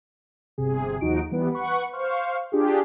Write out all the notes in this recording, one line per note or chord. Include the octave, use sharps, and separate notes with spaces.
G1 C3 G#4
D#2 F3 D#4 F#4 D7
E3 G3 B3 B4
B4 F#5 C#6
C5 F5 C#6
D4 F4 G4 G#4